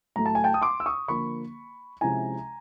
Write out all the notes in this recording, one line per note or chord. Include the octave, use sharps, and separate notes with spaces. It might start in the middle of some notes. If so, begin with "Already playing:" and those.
A2 F#3 A3 A#5
A5
G#5
G5 A5
D#6
C6 D6
E6
C#6 D#6
D3 F3 A#3 B5 C#6
C3 F3 G#3 C#4 E4 G#5 A#5